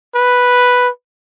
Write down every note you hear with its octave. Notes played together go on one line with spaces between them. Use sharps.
B4